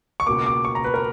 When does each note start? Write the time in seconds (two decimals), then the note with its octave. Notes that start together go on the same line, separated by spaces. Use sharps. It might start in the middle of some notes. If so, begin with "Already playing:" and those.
0.20 C#6
0.26 C#2 B2 A#3 D6
0.46 D6
0.65 C#6
0.75 A#5
0.84 B4
0.94 A#4